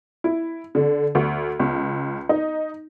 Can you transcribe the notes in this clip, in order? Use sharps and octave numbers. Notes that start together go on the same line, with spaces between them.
E4
D3
D2
C#2
D#4